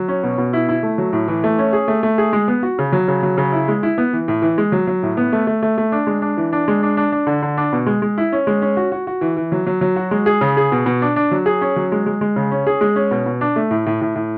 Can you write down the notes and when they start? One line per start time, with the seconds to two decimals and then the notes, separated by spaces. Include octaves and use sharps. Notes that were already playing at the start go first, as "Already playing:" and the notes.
Already playing: F#3
0.08 C#4
0.23 B2
0.38 B2
0.53 E4
0.69 E4
0.83 A3
0.98 F#3
1.13 A2
1.28 E3
1.44 A3
1.59 C#4
1.73 G#4
1.88 A3
2.03 A3
2.18 G#4
2.33 G#3
2.48 B3
2.63 F#4
2.79 C#3
2.93 F#3
3.08 C#3
3.23 F#3
3.37 C#3
3.53 E4
3.68 G#3
3.83 E4
3.98 B3
4.13 E3
4.28 A2
4.42 E3
4.58 G#3
4.72 F#3
4.87 F#3
5.03 A2
5.17 B3
5.33 A3
5.47 A3
5.63 A3
5.78 A3
5.92 D4
6.07 G#3
6.22 D4
6.37 E3
6.53 D4
6.68 G#3
6.83 D4
6.97 D4
7.12 D4
7.27 D3
7.42 D3
7.58 D4
7.73 B2
7.86 G#3
8.02 G#3
8.18 E4
8.32 C#4
8.47 G#3
8.62 C#4
8.77 F#4
8.92 F#4
9.07 F#4
9.21 E3
9.37 E3
9.52 F#3
9.67 F#3
9.81 F#3
9.96 F#4
10.11 G#3
10.26 G#4
10.41 C#3
10.57 G#4
10.72 B2
10.86 B2
11.02 D4
11.16 D4
11.31 F#3
11.46 G#4
11.61 C#4
11.76 F#3
11.92 G#3
12.06 G#3
12.21 G#3
12.36 C#3
12.51 C#4
12.67 G#4
12.81 G#3
12.96 C#4
13.11 B2
13.26 B2
13.41 D4
13.56 A3
13.71 A2
13.86 A2
14.01 A2
14.16 A2